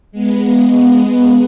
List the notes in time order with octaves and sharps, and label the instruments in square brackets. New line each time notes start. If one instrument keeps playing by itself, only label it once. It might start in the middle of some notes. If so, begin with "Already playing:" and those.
[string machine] G#3 B3